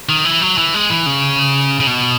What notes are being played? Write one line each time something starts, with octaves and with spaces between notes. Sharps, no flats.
D#3
E3
F#3
E3
G#3
E3
C#3
C#3
B2